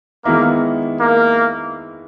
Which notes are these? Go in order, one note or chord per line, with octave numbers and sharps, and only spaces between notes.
D#3 G#3 A#3 B3 E4
A#3